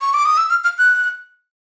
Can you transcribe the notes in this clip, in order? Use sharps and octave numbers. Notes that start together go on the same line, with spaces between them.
C#6
D6
D#6
E6
F6
F6
F#6